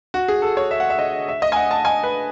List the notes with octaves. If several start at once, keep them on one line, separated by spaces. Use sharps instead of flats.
F#4
G#4
A4
C#5
E5
F#5
E5
D#5
E5
D#5
G#5
F#5
A5
G#5
B4